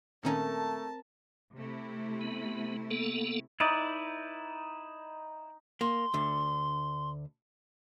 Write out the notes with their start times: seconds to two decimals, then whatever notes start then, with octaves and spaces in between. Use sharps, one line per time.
0.23 A#2 D#3 A3 C4 C#4 A#4 A5 A#5
1.55 C3 A3 E4
2.21 B3
2.91 A#3 B3 A4
3.60 D#4 E4 B4 D5
5.81 A#3 C6
6.14 D2 D3